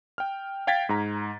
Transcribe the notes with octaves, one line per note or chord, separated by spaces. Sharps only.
G5 F6
F5 G5 G#6 A6 B6
G#2 A#5